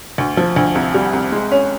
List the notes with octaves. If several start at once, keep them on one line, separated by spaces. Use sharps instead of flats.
D2
F3
D2
C2
G3
C2
G#3
C#4